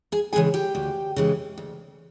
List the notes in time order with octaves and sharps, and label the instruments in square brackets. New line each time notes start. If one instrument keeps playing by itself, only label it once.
[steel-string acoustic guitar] G#4 G#5
C#3 E3 G#3 G#4 G#5
G4 G5
D2
C#3 E3 G#3
D2